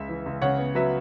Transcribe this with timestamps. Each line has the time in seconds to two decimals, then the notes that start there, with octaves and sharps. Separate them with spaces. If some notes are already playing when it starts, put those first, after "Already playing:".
Already playing: C#2 C#3 E5
0.09 E3
0.26 C#2
0.42 C#3 C#5 F#5
0.58 B3
0.75 F#3 B4 E5